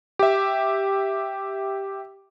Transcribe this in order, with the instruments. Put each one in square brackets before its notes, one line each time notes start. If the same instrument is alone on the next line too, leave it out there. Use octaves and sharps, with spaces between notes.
[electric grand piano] G4 E5